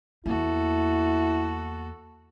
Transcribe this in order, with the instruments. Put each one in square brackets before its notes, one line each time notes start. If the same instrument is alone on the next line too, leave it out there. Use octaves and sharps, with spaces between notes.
[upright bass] E2 A#3 [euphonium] E4 [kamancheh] F#4 A4